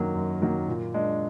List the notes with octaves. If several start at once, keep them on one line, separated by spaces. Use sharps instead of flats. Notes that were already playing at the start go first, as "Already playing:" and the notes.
Already playing: F#2 D#3 F#3 A#3
F#2
D#3 F#3 A#3
A#2
G#3 D4